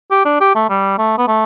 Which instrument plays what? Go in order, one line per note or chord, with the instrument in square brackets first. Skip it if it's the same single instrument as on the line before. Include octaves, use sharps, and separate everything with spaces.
[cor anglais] G4
D4
G4
A3
G3
A3
B3
A3